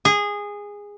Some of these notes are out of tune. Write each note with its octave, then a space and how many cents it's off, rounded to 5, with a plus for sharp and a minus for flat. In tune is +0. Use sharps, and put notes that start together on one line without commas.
G#4 -15